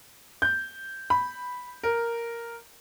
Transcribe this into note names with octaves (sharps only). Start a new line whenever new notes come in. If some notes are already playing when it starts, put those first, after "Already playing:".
G6
B5
A#4